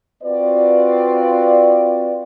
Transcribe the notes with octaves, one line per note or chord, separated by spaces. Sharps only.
C4 F4 F#4 B4 D5